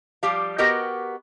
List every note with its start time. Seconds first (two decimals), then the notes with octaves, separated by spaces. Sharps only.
0.23 F3 G3 G4 F5
0.58 B3 F#4 G4 A#4 D#5 G5